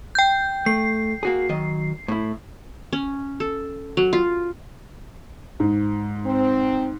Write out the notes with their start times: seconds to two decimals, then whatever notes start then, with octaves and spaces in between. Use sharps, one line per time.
0.15 G5 G6
0.66 A3 C7
1.23 A#3 F#4 G#4
1.49 D#3 F#3 D#5
2.08 A2 E4
2.93 C#4
3.40 A4
3.97 F#3
4.13 F4
5.60 G#2
6.25 C4